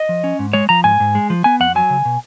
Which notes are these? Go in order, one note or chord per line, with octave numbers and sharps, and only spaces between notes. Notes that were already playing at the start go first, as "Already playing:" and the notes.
Already playing: D#5
F3
C#4
G#2
G#3 C#5
F3 A#5
G#2 G#5
G#2
G#3
F3
B3 G#5
F2 F#5
F#3 G#5
C#3
B2